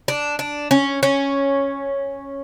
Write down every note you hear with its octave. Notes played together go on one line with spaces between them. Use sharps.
D4
D4
C#4
C#4